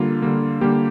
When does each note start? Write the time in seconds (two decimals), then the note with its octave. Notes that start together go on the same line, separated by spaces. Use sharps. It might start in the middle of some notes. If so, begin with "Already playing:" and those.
Already playing: D3 G3 A#3 F4
0.22 D3 G3 A#3
0.61 D3 G3 A#3 G4